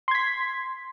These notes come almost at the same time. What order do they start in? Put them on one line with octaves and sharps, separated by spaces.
C6 G#6 B6